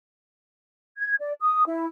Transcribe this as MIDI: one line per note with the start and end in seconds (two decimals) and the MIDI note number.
0.98 1.14 92
1.19 1.33 74
1.41 1.65 87
1.66 1.85 64